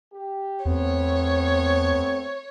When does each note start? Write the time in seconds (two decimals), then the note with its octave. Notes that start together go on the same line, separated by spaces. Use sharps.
0.13 G4
0.65 E2 A3 B3 C4 C#5